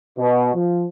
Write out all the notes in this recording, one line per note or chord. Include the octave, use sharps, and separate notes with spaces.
B2
F3